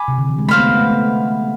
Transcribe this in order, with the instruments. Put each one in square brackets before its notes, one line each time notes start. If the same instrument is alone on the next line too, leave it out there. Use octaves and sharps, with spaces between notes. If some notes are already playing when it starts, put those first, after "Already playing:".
Already playing: [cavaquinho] G#5 B5 D6
[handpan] C3
D3
E3
G#3
[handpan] A3 [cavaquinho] C5 F5 B5
[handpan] B3
B3
A3
B3